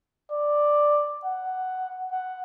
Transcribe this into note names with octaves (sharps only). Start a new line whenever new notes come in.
D5
F#5
F#5